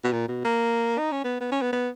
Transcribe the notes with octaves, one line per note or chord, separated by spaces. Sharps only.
B2
A#2
B2
A#3
D#4
C#4
B3
B3
C#4
B3
B3